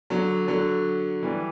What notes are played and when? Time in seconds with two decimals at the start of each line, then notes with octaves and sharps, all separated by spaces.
0.10 D3 F#3
0.48 D3 F#3
1.23 E3 G3